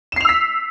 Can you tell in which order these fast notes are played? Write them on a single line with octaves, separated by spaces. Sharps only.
E7 C7 F7 E6 B6